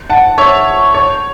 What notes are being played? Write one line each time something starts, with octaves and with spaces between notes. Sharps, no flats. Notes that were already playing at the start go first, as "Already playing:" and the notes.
F#5 A5
C#5 E5
C#5